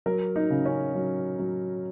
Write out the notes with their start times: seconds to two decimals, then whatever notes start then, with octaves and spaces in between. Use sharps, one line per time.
0.06 F#3 A#4
0.36 D#4
0.50 C#3
0.66 C#4
0.95 F#3
1.39 F#3